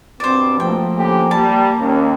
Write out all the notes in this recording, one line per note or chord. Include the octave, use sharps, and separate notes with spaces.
C2 G2 B2 C4 C5 D5
F3 A3 A#3 G5
D3 A#3 C#4 G4
G3 A5
D#2 C#4